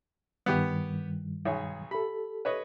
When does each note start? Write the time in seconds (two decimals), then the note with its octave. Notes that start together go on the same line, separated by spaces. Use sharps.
0.46 G2 D#3 G3 B3 G4
1.45 B1 G#4 C#5
1.91 G4 A4 B5
2.45 B4 C#5 D#5